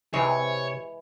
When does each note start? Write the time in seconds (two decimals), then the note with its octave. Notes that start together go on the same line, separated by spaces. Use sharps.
0.14 C3 E3 G#3 C#5